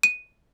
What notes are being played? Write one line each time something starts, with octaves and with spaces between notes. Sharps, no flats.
D#7